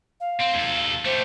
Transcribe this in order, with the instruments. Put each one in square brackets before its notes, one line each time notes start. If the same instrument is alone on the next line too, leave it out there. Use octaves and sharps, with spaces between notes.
[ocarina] F5
[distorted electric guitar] C4
D#2 A4
[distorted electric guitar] A3 G4 [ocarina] C5